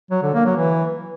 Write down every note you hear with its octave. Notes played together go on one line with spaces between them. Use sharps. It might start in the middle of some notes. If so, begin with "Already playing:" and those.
F#3
D3
A#3
F#3
E3